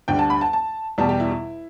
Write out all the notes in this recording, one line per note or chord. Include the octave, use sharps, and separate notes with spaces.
D2 D3 G3 G5
A5
B5
A5
A5
E2 B2 G3 A5
G4
E4
E4